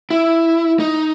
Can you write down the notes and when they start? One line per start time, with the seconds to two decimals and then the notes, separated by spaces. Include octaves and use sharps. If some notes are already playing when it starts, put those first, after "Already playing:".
0.11 E4
0.80 D#4